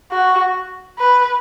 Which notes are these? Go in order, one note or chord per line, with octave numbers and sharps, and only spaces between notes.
F#4
B4